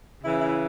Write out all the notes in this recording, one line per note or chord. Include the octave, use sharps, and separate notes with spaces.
C#3 E3 E4
E4